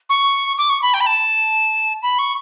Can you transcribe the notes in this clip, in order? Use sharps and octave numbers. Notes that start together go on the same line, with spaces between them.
C#6
D6
C#6
B5
G5
B5
A5
B5
C#6